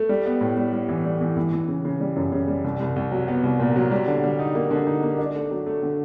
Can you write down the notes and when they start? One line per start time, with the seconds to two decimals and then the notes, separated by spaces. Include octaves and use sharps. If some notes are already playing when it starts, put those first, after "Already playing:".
Already playing: A3
0.09 G3
0.26 B3
0.41 A2
0.57 G3
0.73 G3
0.89 E3
1.05 G3
1.21 E3
1.37 E3
1.53 E3
1.68 C#3
1.85 C#3
2.00 G3
2.16 F#2
2.32 C#3
2.48 G3
2.64 C2
2.80 C2
2.96 C2
3.12 F#3
3.28 B3
3.44 C2
3.60 A#2
3.76 F#3
3.91 G3
4.08 D3
4.24 G3
4.39 D#4
4.55 A#3
4.71 D3
4.87 D#4
5.03 A#3
5.19 D4
5.35 A3
5.51 F#3
5.66 A3
5.83 D3